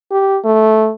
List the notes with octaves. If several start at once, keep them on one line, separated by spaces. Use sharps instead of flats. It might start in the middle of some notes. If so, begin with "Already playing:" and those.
G4
A3